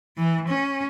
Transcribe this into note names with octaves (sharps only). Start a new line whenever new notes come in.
E3
C#4